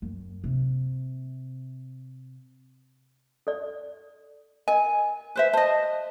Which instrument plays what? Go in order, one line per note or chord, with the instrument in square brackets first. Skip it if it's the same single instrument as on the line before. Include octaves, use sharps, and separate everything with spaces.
[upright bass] F#2
C3
[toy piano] A4 D5
[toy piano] A#4 D#5 [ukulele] G#5
[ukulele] B4 C5 E5
[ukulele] C5 D#5 [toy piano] A5